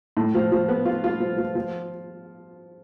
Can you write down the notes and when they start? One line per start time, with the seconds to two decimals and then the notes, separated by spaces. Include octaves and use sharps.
0.17 A2
0.35 F3
0.52 F3
0.69 B3
0.85 F4
1.04 F4
1.20 F3
1.38 F3
1.55 F3